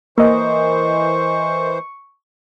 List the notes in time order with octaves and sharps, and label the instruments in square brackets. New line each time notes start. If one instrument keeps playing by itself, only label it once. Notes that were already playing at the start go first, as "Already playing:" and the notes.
[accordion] E3 C5 [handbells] A#3 [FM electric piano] A#4 D#5 [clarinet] C#6